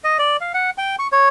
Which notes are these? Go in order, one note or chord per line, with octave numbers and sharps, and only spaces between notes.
D#5
D5
F5
F#5
G5
C#6
C#5